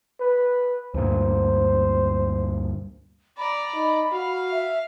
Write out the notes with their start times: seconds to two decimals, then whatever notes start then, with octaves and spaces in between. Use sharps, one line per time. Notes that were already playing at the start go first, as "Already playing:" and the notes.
0.20 B4
0.94 D2 G2 A#2 C5
3.38 D5 A#5 B5
3.74 D#4
4.12 F#4 F5
4.52 E5